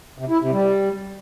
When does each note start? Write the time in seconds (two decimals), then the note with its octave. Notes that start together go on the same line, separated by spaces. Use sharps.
0.18 C3
0.29 E4
0.40 C3
0.51 G3